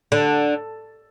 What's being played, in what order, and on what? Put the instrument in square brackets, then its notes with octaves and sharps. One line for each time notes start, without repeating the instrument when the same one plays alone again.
[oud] D3